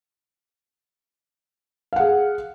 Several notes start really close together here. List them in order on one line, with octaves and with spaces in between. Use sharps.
F5 F#5 G#4